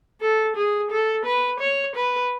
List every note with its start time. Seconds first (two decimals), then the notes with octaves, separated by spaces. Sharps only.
0.21 A4
0.56 G#4
0.90 A4
1.25 B4
1.60 C#5
1.95 B4